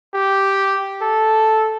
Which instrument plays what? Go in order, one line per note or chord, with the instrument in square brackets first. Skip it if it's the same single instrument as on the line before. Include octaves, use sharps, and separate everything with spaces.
[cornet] G4
A4